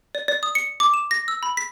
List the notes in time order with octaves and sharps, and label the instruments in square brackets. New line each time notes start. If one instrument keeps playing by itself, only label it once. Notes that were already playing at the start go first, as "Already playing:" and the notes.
[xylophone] D5
D5
D#6
C#7
D6
E7
A#6
E6
B5
B6